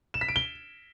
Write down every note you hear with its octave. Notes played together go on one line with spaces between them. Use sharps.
E7
B6
D7
G7